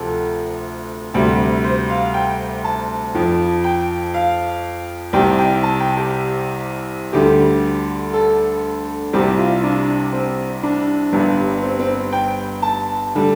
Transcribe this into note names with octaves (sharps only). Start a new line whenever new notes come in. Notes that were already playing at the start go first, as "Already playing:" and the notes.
Already playing: D2 C3 F3 A4
D2 C3 G3
C5
F5
G5
A5
F2 F3
G5
F5
C2 C3 G3 G5
G5
A5
G5
G4
D2 D3 G3 G4
A4
C2 C3 G3 G4
F4
D4
C4
D4
G1 G2 G3
C4
C4
G5
A5
D3 G3